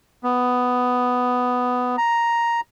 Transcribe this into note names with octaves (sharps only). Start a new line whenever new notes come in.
B3
A#5